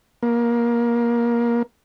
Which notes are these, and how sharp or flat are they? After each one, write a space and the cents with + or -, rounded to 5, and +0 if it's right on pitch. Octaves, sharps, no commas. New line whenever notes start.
A#3 +20